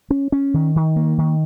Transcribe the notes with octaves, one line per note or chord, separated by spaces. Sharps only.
C#4
C#4
D#3
D#3
A#3
D#3